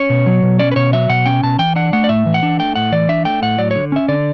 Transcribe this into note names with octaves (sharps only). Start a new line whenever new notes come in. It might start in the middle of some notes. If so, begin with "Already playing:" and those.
Already playing: C#4 C#5
B2
F#3
B2
C#4 D5
B4
B2 C#5
F#3 E5
B2 F#5
C#4 G5
B2 A5
E3 G5
D4 F#5
A3 F#5
D5
A2 E5
E3
F#5
D4
A3 G5
A2 F#5
E3 D5
D4 E5
A3 G5
A2 F#5
F#3 D5
D3 C#5
C#4 E5
D3 D5